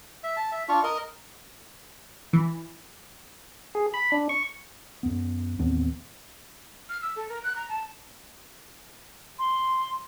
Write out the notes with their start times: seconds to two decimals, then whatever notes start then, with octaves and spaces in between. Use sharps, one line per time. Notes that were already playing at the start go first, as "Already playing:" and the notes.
0.23 E5
0.37 A5
0.52 E5
0.69 D4 F4 C#6
0.84 A#4 D#5
2.33 E3
3.75 G#4
3.94 B5
4.12 D4
4.29 C#6
5.03 F#2 B3
5.59 A1 D#2 B3 C4
6.89 F6
7.02 E6
7.16 A4
7.29 A#4
7.43 F#6
7.56 A#5
7.69 A5
9.39 C6